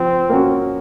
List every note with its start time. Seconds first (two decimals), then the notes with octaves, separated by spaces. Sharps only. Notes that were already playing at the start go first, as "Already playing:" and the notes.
Already playing: F3 C4
0.29 A#3 C#4 F#4